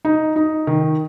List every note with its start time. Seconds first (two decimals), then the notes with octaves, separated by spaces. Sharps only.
0.05 D#4
0.36 D#4
0.67 D#3